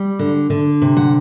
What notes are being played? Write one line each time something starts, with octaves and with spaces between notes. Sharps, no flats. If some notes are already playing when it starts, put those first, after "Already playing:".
Already playing: G3
D3
D3
C3
F#5